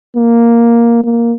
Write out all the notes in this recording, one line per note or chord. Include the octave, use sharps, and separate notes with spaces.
A#3
A#3